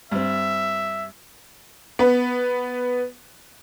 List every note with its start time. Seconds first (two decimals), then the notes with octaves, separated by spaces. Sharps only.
0.12 G2 C4 E5
1.99 B3 B4